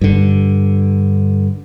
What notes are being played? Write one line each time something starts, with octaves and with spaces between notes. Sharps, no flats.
G2 D3